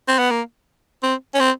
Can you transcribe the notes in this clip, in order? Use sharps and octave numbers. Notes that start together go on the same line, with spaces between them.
C4
B3
A#3
C4
C#4
C4